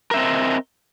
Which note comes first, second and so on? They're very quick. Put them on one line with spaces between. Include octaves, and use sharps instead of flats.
A#4 E5 C4 D#5